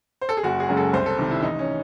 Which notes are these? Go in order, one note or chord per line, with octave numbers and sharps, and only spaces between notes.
C5
A4
G#4
F#1 F#4
G#4
F#2 C#3 G#3
A4
C2 C5
A4
C3 D#3
E4
A1 D#4
C#4